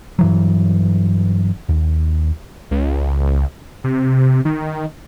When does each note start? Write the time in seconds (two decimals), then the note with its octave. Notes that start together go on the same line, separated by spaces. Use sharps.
0.19 G2 E3 F#3
1.69 D#2
2.71 C#2
3.84 C3
4.45 D#3